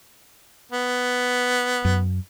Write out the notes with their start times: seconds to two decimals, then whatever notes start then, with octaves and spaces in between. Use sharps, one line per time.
0.72 B3
1.85 F#2